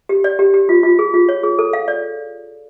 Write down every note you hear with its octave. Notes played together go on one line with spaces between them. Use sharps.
G4
D5
G4
G4
F4
F4
G#4
F4
C#5
G#4
A4
F5
D5